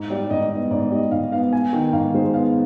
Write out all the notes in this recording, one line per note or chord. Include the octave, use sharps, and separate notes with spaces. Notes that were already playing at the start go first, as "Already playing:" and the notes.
Already playing: G#2
G3 D5
G#2 D#5
B3 D#5
G#2 D5
G3 D#5
G#2 F5
B3 F5
B3 G#5
D#3 G5
G#2 F5
G#3 C5
B3 F5